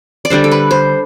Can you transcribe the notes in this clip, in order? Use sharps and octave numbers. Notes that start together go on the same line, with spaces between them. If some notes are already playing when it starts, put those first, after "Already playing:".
D5
D3 G3 D4 C5
A4
B4
C5